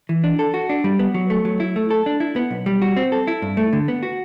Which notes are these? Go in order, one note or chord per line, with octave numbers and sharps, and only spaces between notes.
E3
D4
A4
F#4
D4
G3
B3
F#3
A3
F#3
E4
A3
A4
D4
E4
B3
B1
G3
F#4
C4
A4
E4
G2
A3
D3
B3
F#4